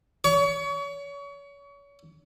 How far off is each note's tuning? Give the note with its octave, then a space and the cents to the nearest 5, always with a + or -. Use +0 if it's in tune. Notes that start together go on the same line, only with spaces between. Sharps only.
C#5 +35 C#6 +30